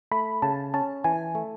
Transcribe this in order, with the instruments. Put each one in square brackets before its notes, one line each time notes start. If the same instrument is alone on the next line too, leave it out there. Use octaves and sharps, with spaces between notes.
[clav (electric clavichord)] A3 [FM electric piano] B5
[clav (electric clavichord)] C#3 [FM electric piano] A5
[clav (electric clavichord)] C#4 [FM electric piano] A5
[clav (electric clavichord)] E3 [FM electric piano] G#5
[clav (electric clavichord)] A3